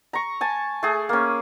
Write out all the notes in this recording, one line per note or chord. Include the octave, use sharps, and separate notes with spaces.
A#5 C#6
G#5 A5
A3 G#4
A#3 C#4